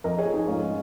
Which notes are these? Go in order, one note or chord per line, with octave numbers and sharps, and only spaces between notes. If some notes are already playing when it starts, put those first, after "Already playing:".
F2 A#4 D#5
G#4 C#5
F3
D#4 G#4
G#2 C#4 F4